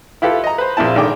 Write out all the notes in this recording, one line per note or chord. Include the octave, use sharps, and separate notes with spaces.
E4 F4 G4 A4 B4
D#5 A#5
B4 C5
A#1 A#3 C4 E4 A5
G#1 D3 D#3 G5 D6